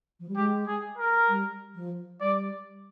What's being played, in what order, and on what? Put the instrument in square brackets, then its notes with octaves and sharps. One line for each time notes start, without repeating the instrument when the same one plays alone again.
[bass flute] F3
G3
[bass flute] G#3 [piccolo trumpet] G4
[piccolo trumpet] G#4
A#4
[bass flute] G3
F3
[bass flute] G3 [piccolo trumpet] D5